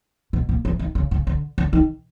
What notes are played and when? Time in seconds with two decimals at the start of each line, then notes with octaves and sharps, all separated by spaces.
0.33 B2
0.49 A#2
0.65 E3
0.79 D#3
0.95 C#3
1.11 C#3
1.27 D3
1.58 D3
1.73 D#3